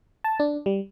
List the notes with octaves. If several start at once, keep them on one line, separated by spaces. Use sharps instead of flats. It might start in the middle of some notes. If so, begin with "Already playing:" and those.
A5
D4
G3